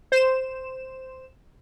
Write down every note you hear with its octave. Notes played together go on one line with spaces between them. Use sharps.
C5 E7